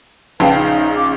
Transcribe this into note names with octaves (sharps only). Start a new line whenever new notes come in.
A#1 C#3 B4 F5 G5 A5
D#4
D6